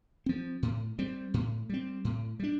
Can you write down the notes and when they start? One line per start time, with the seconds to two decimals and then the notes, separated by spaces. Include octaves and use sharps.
0.26 F3 C4
0.63 A2
0.99 G3 C4
1.34 A2
1.69 G3 C4
2.05 A2
2.40 G3 D4